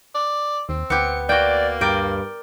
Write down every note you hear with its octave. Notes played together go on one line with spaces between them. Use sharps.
D5
D#2 C4
D2 B3 G4 C#7
A#3 F#4 D5 G5
G2 A#4 D5 G5